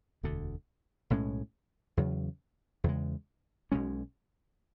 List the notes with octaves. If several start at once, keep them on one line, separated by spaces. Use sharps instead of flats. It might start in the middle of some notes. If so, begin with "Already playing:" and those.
E1 D2 D3
B1 A2 G#3 C#4
E2 C#3 F#3
E2 C#3 G#3
B1 B2 G#3 C#4